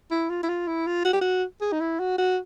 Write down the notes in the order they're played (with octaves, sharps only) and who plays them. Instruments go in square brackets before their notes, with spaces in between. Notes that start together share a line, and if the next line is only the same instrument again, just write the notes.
[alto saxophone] E4
F4
E4
F4
E4
F4
F#4
G4
F#4
G#4
D#4
E4
F#4
F#4